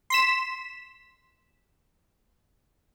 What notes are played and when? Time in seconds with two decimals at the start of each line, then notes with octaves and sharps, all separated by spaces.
0.10 C6 B6 E7